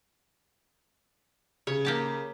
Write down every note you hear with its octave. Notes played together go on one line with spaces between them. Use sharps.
C#3 C#5
A#3 G4 A5